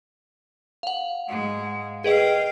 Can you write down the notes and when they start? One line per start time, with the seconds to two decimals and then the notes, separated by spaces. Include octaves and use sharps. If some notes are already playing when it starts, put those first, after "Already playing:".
0.83 F5 F#5
1.28 G#2 G#3
2.04 G#4 B4 D#5 F5 G5